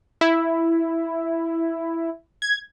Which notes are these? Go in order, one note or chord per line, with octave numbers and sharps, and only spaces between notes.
E4
G#6